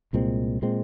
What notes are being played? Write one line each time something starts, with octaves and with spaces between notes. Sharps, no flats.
C2 A#2 G#3 C4
A#2 G#3 C4